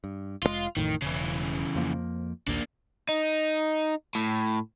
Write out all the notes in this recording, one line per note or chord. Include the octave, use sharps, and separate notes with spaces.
G2
F1 C3 G#3 F4
A1 F2 A2 D#3
E1 C#3 E3
F2 F3 A#3
A#1 D#2 A#3 D4
D#4
A2